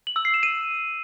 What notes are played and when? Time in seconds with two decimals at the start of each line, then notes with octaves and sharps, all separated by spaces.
0.07 F#7
0.16 E6
0.25 C7
0.34 E7
0.43 D#7